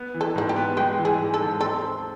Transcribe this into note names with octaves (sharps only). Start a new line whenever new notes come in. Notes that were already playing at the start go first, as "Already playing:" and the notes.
Already playing: B3
E3
A4
G#2 F#4
G4
B3
G#3 G4
E3
G#4
G#2
A4
G#2
C4 A4
C4